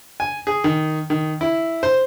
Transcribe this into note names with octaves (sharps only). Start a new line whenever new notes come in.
G#5
G#4
D#3
D#3
E4
C5